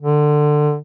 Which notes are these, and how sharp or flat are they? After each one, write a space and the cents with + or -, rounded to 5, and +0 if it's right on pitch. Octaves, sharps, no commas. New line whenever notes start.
D3 +20